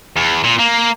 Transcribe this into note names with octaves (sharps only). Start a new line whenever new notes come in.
E2
A#2
A#3